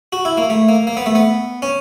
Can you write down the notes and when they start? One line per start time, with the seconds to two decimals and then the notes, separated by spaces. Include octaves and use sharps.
0.13 F#4
0.25 E4
0.37 A#3
0.50 A3
0.69 A#3
0.87 A#3
0.97 B3
1.06 A3
1.15 B3
1.62 C#4